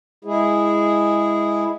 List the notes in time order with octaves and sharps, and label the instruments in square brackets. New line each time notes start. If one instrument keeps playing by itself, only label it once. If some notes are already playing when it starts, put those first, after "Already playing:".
[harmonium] G#3 E4 G#4